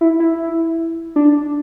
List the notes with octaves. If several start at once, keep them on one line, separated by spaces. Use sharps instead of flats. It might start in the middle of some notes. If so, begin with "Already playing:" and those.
E4
E4
D4